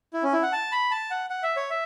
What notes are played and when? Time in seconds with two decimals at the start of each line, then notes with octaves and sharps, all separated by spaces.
0.13 E4
0.23 C#4
0.33 E4
0.43 F#5
0.52 A5
0.72 B5
0.91 A5
1.10 F#5
1.30 F#5
1.43 E5
1.57 C#5
1.70 E5